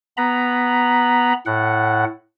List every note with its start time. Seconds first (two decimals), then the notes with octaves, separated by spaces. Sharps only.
0.17 B3 A#5 B5
1.46 A2 F#5